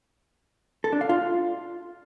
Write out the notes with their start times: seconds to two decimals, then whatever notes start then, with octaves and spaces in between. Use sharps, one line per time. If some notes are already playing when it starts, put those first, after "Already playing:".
0.84 A4
0.93 D4
1.01 F5
1.09 F4